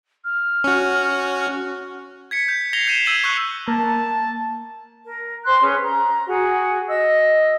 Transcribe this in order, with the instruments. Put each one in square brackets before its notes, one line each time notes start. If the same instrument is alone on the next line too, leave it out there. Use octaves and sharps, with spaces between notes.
[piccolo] F6
[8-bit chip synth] C#4 F#4
[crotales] G#6 B6 C#7
G6
G#6 A#6 C7 F7 G7
G6 C7 D#7 E7
E6 G#6 D#7 F7 F#7
C#6 E6 F#6
[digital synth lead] A#3 [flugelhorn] A5
[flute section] A#4
C5 G5 C6 F#6
C#4 G#4 B4 C#5
A#5
F#4 G#4
D#5 E6